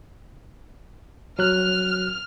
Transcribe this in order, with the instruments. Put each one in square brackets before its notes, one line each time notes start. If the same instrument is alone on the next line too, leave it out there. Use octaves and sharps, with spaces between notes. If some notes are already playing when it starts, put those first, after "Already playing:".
[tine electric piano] F#3 F#6 [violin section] F6